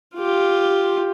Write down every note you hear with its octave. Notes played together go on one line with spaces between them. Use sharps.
F4 G4